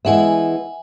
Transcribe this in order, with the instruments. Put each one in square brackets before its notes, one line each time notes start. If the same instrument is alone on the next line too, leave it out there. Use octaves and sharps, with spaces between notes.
[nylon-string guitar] E3 G#3 B3 [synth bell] E5 F#5 G#5